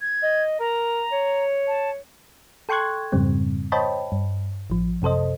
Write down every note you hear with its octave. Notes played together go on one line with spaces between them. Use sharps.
G#6
D#5
A#4 A#5
C#5
A5
A4 G5 C6 C#6 F#6 G#6
F2 G#2 C#3 G3 C4
C5 C#5 D#5 G5 A5 B5
G2
A1 F3
F#2 C3 A4 C5 D#5